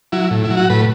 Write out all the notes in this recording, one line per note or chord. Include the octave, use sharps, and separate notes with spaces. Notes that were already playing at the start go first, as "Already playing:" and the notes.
F#3 E4
A2
E4
F#3
F#4
A2 B4